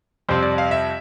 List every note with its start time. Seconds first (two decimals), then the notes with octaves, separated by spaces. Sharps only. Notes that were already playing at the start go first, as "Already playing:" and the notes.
0.29 F2 C3 G3 C4 C5
0.43 D5
0.58 F5
0.71 E5